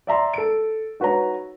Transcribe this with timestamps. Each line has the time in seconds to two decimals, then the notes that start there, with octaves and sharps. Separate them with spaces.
0.07 D5 E5 A#5 C6
0.34 A4 D7
1.00 D#4 F#4 B4 C#5 A#5